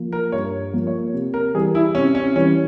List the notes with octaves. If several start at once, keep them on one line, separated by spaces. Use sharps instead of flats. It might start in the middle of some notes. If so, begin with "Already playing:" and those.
Already playing: F3 A#3
A#4
G2 C#5
F3 A#3
C#5
C3
A#4
E3 G3 G#4
E4
C3 C#4
C#4
E3 G3 C#4